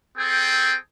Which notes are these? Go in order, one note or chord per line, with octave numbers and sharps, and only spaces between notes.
C4 G#4 A4 G5